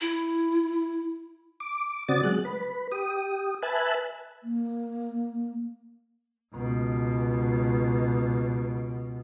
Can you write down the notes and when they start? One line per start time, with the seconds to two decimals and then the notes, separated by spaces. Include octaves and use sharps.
0.01 E4
1.60 D6
2.08 C#3 C4 F#4 D5 D#6 A6
2.23 F#3 G#3 F#6
2.45 B4
2.92 G4 D#6
3.62 B4 E5 G#5 A5 F#6
4.43 A#3
6.55 C#2 B2